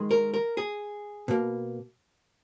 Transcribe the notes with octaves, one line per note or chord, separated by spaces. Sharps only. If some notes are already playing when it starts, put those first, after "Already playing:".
Already playing: D#3 G#3
A#4
A#4
G#4
B2 A#3